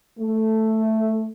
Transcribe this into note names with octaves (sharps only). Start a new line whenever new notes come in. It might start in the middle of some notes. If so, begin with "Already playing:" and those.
A3